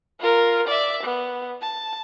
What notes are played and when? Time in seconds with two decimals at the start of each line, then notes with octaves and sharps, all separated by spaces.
0.20 F4 A#4
0.68 D5 E5
1.03 B3
1.62 A5